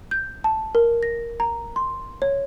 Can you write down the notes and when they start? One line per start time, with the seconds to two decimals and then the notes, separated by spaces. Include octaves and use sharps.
0.11 G6
0.44 A5
0.75 A#4
1.03 A#6
1.40 A#5
1.76 C6
2.22 C#5